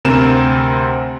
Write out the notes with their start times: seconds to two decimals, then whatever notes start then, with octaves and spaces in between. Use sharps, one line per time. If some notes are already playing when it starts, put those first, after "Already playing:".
0.05 D2 C3 C4 A#4 E7